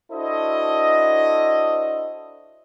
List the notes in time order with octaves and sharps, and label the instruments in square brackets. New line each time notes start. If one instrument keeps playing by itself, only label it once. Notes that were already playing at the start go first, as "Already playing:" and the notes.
[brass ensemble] D4 E4 F#4 A4 C5 D#5